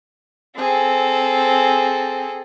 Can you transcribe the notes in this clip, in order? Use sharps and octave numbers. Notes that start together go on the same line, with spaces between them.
C4 G#4 A4